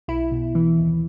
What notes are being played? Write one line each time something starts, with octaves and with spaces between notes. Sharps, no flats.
B1 E4
B2
E3
D#2